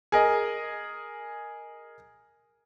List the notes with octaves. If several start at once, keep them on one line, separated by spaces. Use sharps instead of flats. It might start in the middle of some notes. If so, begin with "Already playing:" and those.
G#4 A#4 D#5